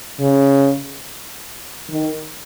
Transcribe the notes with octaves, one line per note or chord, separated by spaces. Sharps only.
C#3
D#3